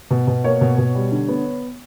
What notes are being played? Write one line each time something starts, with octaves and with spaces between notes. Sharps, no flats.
B2
B2
A#3 C#5
B2
B2
G3
D3
B3